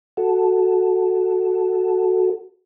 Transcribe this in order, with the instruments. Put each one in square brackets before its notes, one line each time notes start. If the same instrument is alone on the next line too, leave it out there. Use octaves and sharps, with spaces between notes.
[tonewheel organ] F#4 A4